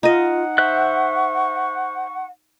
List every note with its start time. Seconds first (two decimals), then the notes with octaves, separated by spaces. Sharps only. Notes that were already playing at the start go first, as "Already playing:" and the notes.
0.03 D#4 F4 D#5 F#5
0.58 C5 E5 C#6 F#6